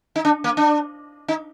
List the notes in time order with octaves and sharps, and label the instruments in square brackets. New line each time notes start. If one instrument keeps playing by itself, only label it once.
[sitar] D#4
D4
A#3
D4
D#4